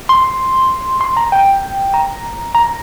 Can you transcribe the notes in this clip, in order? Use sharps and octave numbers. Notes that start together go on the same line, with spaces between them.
C6
C6
A#5
G5
A#5
A#5